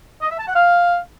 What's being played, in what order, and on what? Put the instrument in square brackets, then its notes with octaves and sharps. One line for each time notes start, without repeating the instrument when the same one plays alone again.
[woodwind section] D#5
E5
A5
F#5
F5